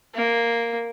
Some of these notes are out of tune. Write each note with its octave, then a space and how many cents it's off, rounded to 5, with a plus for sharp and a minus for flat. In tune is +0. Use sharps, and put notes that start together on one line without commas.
A#3 +0